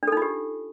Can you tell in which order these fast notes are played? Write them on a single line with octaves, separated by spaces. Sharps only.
D4 A4 D#4 F4 G4